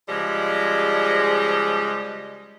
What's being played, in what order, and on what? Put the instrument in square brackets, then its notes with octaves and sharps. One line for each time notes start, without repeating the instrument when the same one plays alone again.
[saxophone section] C#3 F3 G3 G#3